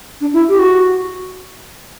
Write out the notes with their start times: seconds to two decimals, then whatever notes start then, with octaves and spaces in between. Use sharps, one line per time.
0.21 D4
0.33 E4
0.49 G4
0.59 F#4